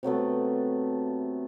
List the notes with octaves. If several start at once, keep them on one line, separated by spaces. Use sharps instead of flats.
C3 F#3 A3 B3